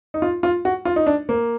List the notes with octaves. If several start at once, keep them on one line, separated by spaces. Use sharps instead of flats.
D#4
F4
F4
F#4
F4
D#4
D4
A#3